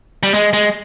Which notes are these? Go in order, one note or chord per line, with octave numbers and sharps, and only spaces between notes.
G3
G#3
G#3